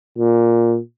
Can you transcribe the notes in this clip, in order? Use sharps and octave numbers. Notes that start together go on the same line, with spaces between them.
A#2